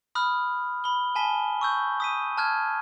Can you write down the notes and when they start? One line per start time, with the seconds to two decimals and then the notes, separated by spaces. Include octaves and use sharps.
0.15 B5 D#6 F6 F#6
0.84 B5 G7
1.15 G#5 A5 B6 G7
1.61 C#6 E6 G6
2.00 D#6 B6 D#7
2.38 A5 F6 F#6 G#6